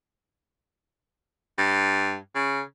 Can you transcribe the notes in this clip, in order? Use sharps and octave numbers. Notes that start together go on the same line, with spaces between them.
G2
C#3